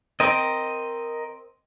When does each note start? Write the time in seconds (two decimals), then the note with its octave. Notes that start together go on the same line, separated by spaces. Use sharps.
0.20 C4 A#4 D#5